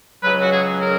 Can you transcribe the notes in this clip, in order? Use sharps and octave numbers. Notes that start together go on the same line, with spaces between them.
C#2 C#3 F#3 B4
F#4
G#4
A#4